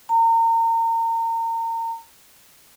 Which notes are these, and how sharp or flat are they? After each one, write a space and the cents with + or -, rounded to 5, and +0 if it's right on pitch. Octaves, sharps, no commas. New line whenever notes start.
A#5 -35